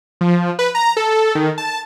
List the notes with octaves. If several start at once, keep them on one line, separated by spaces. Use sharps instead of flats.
F3
B4
A#5
A4
D#3
A5